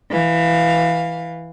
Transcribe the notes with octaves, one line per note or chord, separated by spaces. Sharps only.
E3 F5